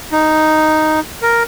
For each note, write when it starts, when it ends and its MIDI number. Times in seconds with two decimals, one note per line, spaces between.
0.12 1.00 63
1.22 1.43 70